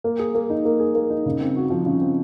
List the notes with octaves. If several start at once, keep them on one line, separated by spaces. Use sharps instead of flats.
A#3
G#4
A#3
D#4
A#3
G#4
A#3
D#4
C#3
C4
F#4
F3
C#3
C4